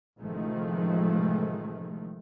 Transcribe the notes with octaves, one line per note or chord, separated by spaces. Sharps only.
A1 C3 D#3 F3 G#3 A3